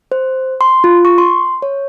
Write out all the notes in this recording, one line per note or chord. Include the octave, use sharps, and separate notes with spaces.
C5
C6
F4
C#6
C6
C#5